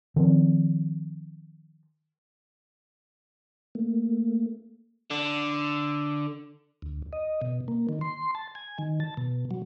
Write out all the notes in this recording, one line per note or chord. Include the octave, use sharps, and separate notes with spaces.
D#3 F3 C4
A3 A#3
D3
D2
D#5
B2
A#3
D#3
C6
A5
G#5
D#3
A5
B2
F#3